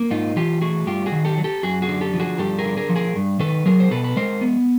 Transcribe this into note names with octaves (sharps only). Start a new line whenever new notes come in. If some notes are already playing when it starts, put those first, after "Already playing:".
Already playing: A#3
G#2 D#4 F4
E3 F4 G4
A3 F#4 G#4
G2 F4 G4
F#4 G#4
D#3
G4 A4
F#3
G4 A4
F#2 F#4 G#4
F#4 G#4
D3
G4 A4
F3
F#4 G#4
G2 G4 A4
G#4 A#4
D3
G#4 A#4
F3
G#4 A#4
G2
D#3 A4 B4
F#3 G#4 A#4
C5
B2 A4 B4
B4
G#3 A#4 C5
B3